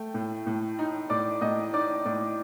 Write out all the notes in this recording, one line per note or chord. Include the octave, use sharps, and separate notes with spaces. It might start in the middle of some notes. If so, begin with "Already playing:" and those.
Already playing: A3 G5
A2
A2
D#4
A2 D5 D6
A2 D#5 D#6
D#4 D5 D6
A2 D5 D6